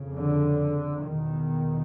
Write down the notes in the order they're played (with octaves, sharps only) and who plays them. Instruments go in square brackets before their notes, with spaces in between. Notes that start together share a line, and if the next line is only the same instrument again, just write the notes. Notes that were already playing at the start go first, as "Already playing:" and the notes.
Already playing: [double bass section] F2 C#3
D3
E2 B2 D#3